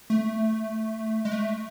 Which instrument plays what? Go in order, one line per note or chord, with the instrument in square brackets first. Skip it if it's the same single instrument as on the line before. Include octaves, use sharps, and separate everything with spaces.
[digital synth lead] A3
G#3
A3